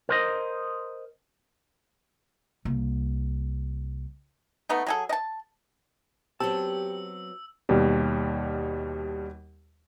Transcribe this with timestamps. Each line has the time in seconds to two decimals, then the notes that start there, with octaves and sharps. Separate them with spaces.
0.09 A#4 C5 D#5
2.65 C2 A#3
4.69 A3 B3 D#4
4.87 F#3 G#4 A4
5.09 D#5 A5
6.40 F#3 B3 C4 G4 A5 E6
7.69 D#2 B2 G3